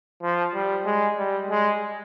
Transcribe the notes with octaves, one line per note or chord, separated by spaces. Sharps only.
F3
G3
G#3
G3
G#3